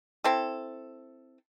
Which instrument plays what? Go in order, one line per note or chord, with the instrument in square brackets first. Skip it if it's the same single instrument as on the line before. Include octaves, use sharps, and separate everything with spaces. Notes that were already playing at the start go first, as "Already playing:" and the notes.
[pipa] C4 E4 A4